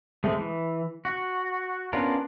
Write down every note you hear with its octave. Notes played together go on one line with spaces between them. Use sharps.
G#3 A3 C4
E3
F#4
B3 C#4 D4 F4 A#4